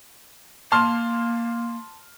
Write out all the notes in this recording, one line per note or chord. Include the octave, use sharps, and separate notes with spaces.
A#3 A5 C6 F6